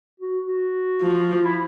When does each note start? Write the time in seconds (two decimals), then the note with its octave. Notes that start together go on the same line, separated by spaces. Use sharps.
0.20 F#4
0.47 F#4
1.01 F3
1.44 E4